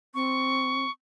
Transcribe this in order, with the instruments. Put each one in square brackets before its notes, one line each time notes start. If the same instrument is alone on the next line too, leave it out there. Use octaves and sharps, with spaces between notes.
[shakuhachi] C4 [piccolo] C#6